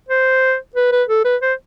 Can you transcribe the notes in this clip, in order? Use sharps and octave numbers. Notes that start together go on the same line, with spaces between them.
C5
B4
B4
A4
B4
C5